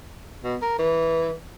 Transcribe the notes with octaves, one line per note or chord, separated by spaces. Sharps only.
B2
A#4
E3